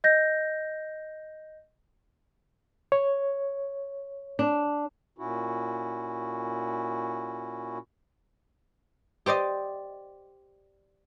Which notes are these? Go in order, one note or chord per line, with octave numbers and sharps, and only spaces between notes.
D#5 G6 A#6
C#5
D4
A#2 C#4 E4 F#4
G4 C5 D5 D#5